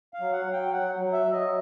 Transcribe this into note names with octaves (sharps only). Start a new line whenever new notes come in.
F5
F#3
F#5
F#3
G5
F#3 F#5
F#3
E5
F#3
D#5